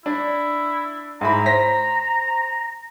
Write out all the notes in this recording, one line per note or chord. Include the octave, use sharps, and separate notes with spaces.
D4 E4
G#2 E4 A#5 B5
C5 A#6 B6